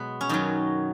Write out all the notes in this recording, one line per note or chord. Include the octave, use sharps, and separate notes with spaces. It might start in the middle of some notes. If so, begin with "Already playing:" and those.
Already playing: B2 F#3 G#3 B3
C#4
F#2 D#3 F#3 D#4